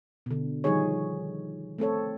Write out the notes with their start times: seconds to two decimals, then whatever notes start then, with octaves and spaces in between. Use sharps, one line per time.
0.26 B2 D3
0.64 D#3 F3 G3 D#4 G#4 C#5
1.78 A3 C4 A4 C#5